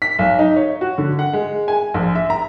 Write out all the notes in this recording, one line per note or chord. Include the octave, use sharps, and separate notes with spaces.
B6
B1
D#4
C#5
F#4
D3
F#5
G#3
G#5
A#1
E5
A#5